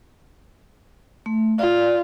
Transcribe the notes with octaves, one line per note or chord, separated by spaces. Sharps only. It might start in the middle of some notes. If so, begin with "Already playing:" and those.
A3
F4 D5